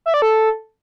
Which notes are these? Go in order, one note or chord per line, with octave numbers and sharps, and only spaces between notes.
E5
D5
A4